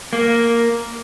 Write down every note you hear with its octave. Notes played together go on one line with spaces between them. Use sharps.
A#3